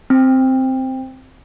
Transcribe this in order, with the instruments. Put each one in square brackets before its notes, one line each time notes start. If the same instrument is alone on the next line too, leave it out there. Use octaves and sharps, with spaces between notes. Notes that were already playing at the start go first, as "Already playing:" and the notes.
[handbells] C4